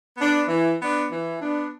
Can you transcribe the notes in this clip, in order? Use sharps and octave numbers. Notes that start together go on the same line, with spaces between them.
B3 D4
E3
B3 D4
E3
B3 D4